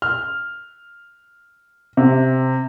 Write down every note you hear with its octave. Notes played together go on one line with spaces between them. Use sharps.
F6
C3